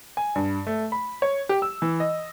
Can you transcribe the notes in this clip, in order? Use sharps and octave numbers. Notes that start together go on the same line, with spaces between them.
G#5
G2
A3
B5
C#5
G4
E6
E3
D#5